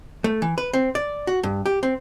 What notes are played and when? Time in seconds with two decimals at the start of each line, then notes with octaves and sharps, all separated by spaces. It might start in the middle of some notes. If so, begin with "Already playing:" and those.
0.24 A3
0.42 E3
0.58 B4
0.73 C4
0.95 D5
1.27 F#4
1.43 G2
1.66 G4
1.83 C4